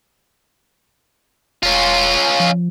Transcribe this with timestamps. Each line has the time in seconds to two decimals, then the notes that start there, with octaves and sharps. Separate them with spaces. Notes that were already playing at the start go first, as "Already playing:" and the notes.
1.63 E1 C#4 F4
2.40 F3